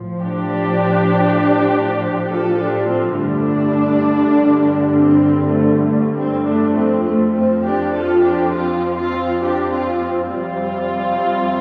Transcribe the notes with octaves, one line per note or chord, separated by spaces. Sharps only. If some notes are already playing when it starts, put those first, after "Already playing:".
Already playing: A2 F3
D4 G4
F4 A4
D4 G4
C4 F4
G2 D3 G3 A3 D4
C4
A3
A3
C4
A3 D4
F2 F3 C4
A3
C4
D4 G4
F4 A4
D4 G4
C4 F4
C4 F4
D4 G4
C4 F4
C4
F2 C3 G3 C4 F4